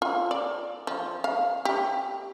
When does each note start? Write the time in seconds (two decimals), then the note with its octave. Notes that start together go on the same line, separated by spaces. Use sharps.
0.02 F4
0.31 D5
0.87 F3
1.24 F5
1.65 G4